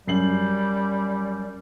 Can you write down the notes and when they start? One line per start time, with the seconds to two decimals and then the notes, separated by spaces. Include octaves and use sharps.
0.07 F#2 G3 C7 F#7